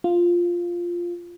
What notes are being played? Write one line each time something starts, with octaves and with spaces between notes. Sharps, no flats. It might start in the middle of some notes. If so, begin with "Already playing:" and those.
F4